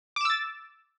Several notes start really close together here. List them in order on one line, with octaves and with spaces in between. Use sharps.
D6 E7 E6 A6